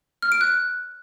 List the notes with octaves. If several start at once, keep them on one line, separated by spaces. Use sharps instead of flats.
F6
D7
F#6